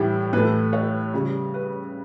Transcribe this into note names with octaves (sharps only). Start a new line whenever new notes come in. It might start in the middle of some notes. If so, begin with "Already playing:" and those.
Already playing: A2 E3 G3 E4 G4
A2 E3 A3 B4
C#5
C#3 G3
B4